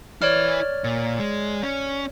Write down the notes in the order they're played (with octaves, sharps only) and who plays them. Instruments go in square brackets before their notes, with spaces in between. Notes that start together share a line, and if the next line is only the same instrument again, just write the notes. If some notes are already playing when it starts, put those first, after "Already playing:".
[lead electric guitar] E4 B4 [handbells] C#5 D5 F6
[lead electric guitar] A#2
G#3
C#4